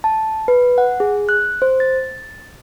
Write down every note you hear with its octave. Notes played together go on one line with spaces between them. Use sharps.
A5
B4
F#5
G#4
F#6
C5
A6